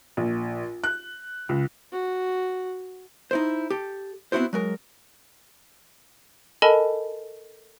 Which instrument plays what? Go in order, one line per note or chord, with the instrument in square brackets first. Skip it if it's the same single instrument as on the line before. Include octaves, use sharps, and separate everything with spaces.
[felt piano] A#1
F#6
C#2
[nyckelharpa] F#4
[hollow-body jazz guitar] D#4 E4 C5
G4 A4
B3 C4 D#4 E4 F#4 C5
F#3 G#3 A#4
[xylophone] A4 A#4 D#5 G#5 A5 B5